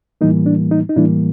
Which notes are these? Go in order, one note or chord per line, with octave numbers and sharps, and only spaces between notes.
A2 E3 G3 A#3 D#4
D4
D#4
D#4
A2 E3 G3 A#3 D4 E4